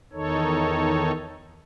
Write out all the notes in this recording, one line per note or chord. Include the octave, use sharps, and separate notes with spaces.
E2 D#3 D#4 A4 C#5